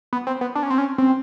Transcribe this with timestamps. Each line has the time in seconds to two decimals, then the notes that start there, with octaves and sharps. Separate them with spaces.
0.13 B3
0.27 C4
0.41 B3
0.55 D4
0.63 C#4
0.70 C4
0.78 C#4
0.98 C4